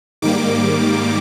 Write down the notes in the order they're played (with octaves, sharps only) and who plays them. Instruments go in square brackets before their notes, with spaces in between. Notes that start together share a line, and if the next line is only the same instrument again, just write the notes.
[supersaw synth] G#2 D#3 G3 A#3 D6